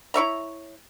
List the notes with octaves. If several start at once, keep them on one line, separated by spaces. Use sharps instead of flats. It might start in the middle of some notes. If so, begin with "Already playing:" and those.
E4 C#5 E5 A#5